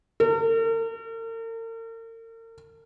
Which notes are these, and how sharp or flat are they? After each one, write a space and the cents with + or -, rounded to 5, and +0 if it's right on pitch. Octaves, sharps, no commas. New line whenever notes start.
A#4 -45